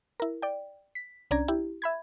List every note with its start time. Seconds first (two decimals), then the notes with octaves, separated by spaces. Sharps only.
0.20 E4 A#4
0.42 D5 G5
0.95 B6
1.31 C2 C#4 D4 D5 A#5 G#6
1.48 E4 G4
1.82 E5 B5 G#6